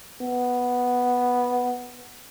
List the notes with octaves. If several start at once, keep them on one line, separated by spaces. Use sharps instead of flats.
B3